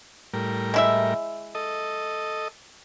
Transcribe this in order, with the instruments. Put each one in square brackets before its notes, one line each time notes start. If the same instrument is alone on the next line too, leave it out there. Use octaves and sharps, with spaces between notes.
[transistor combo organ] A2 G3 A#4
[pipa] G#3 E4 E5
[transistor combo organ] A4 D#5